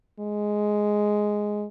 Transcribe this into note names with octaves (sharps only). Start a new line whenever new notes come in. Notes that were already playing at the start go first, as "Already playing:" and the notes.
G#3